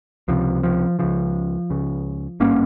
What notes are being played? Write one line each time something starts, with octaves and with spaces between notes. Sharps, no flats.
C#2 C3 F3
F3
C#2 C#3 F3
C#2 C#3
G#1 G2 A#3 C#4